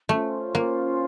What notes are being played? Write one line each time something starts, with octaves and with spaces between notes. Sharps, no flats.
A3 C#4 F4 C5
A#3